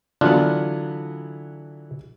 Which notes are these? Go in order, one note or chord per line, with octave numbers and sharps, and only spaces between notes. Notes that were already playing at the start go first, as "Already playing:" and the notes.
D3 E3 F#3 B3 D4 F4